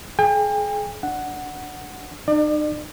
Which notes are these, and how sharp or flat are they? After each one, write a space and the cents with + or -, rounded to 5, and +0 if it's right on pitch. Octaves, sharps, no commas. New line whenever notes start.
G#4 +35 G5 +40
D4 +0 F#5 +0
D#4 -40 D5 +35